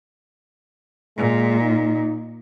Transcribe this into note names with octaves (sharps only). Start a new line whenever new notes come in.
A#2 G#3
D#4